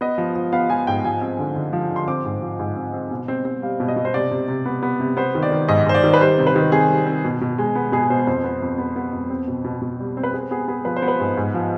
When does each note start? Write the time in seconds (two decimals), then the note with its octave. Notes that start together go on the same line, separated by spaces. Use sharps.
0.01 B3 D#5
0.18 F3
0.35 F3
0.52 B3 F5
0.70 F3 G#5
0.87 G#2 G5
1.04 F3 G#5
1.21 C4
1.39 D3
1.56 D3
1.73 F3
1.91 D3
1.96 C6
2.08 C4 D6
2.25 G#2
2.42 F3
2.59 G#2
2.76 C4
2.93 C4
3.11 B2
3.28 C4
3.45 C4
3.62 G3 F5
3.80 B2
3.88 D#5
3.96 B2
4.05 C5
4.14 C3 D5
4.31 C3
4.48 C3
4.66 B3
4.83 B3
5.00 C3
5.17 B3 C5
5.35 D#3
5.43 D5
5.52 D#3
5.68 G#2 D#5
5.86 G#2 C5
5.94 D5
6.04 D#3
6.14 B4
6.21 G3 C5
6.38 C3
6.47 B4
6.56 D#3
6.72 C4 G#4
6.89 G3
7.06 C4
7.24 B2
7.41 B2
7.58 G#3
7.75 B3
7.92 B2 G#4
8.10 B2 C5
8.27 F2 C5
8.44 B3
8.62 F2
8.78 B3
8.96 B3
9.13 F2
9.30 C4
9.48 B2
9.64 B2
9.82 B2
9.99 G3
10.17 C4
10.23 B4
10.34 B3 G#4
10.51 B3 G#4
10.68 B3 G#4
10.85 F3 B4
10.96 C5
11.02 B3
11.08 B4
11.20 G#2
11.37 G#2
11.54 F3